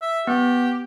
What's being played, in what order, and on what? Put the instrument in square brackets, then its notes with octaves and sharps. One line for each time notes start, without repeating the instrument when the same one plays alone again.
[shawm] E5
[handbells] B3 [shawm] G4